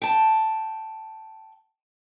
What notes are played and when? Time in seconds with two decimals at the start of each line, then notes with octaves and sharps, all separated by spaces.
0.02 G5 A5